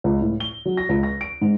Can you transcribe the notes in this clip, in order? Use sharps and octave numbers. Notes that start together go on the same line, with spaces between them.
C#2
A2
G7
F#3
A#6
C#2
A#6
D7
G#2